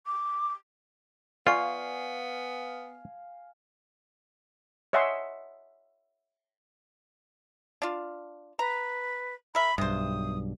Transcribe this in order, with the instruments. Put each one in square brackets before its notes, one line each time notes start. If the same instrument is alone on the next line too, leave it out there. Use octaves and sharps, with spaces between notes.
[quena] D6
[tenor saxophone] B3 [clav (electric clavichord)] F4 [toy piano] D5 C#6 [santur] F5 G#5
[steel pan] C#5 D#5 E5 F#5 G#5 C6
[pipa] D4 F4
[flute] B4 [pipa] A#5
[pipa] A#4 E5 [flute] B5
[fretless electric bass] B1 G2 [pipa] C3 C5 [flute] D#6